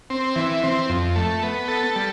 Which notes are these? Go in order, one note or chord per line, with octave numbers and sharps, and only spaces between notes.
C4
E3
C4
F2
A3
B3
A4
G3